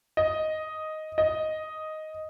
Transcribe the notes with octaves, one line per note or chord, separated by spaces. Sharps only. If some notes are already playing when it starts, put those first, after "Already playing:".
D#5
D#5